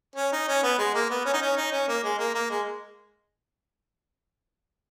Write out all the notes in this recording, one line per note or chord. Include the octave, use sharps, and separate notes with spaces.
C#4
D#4
C#4
B3
G#3
A#3
B3
C#4
D#4
C#4
D#4
C#4
A#3
G#3
A#3
A#3
G#3